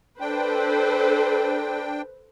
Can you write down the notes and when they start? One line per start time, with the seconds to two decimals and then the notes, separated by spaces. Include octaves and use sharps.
0.21 D4 A4 B4 C5 G5